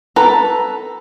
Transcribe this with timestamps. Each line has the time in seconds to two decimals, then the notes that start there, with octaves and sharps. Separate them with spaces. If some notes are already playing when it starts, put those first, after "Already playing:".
0.16 A4 B4 A#5